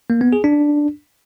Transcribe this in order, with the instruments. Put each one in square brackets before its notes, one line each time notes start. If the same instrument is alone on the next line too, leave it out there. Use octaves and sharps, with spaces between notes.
[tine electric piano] A#3
B3
G#4
D4